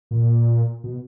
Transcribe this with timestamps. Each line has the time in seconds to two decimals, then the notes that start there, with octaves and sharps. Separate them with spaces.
0.11 A#2
0.84 B2